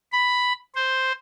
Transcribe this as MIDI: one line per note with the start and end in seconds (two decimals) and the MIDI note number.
0.12 0.53 83
0.75 1.12 72